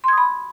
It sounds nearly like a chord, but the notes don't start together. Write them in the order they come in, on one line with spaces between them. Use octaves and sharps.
C6 G#6 D#6 B5